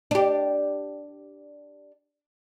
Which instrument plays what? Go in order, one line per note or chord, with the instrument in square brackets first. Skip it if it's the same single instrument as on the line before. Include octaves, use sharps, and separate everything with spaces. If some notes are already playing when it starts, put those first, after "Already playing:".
[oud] D4 G4